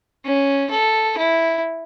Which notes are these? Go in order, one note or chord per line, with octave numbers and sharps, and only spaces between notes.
C#4
A4
E4